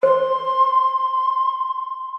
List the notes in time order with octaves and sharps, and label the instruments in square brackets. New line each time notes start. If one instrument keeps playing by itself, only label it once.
[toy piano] C5 [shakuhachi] C6